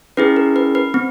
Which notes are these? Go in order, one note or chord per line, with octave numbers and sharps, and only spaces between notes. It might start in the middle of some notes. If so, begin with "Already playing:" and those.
C#4 E4 G#4 B4
A#4
B4
B4
C4